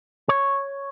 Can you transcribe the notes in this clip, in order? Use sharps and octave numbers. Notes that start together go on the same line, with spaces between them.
C#5